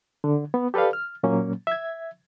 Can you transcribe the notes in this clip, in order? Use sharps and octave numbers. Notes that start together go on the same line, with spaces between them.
D3
B3
G4 A4 B4 D5 F5
F6
A#2 F#3 A#3 C#4
E5 G#6